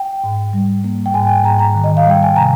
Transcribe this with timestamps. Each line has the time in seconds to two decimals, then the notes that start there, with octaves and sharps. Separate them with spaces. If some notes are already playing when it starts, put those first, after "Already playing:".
Already playing: G5
0.24 G#2
0.53 G3
0.84 A#3
1.06 G5
1.14 G#2 G#5
1.29 G5
1.44 G#2 A#5
1.59 A#5
1.74 D#3
1.84 D#5
1.97 F5
2.05 G3 G5
2.23 G#5
2.35 C3 A#5